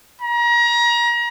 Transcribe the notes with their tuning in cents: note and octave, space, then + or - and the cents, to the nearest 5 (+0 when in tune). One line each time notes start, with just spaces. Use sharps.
A#5 +30